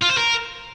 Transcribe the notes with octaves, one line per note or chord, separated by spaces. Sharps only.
F4
C5
A#4